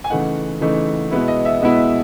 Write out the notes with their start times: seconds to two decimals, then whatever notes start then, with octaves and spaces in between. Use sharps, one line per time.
0.04 G#5
0.10 C#3 E3 A3 D#4 F#5
0.61 C#3 E3 A3 D#4
1.11 B2 G#3 B3 E4
1.28 D#5
1.45 E5
1.62 B2 G#3 B3 E4